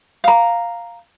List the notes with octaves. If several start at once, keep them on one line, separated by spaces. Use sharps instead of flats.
F5 A#5